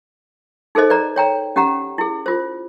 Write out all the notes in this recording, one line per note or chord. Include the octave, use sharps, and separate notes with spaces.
D#4 G#4 A4 C5 D#5
B4 D5 A#5
C#5 G5 A#5
C#4 G4 F#5 A#5
E4 G#4
F4 C5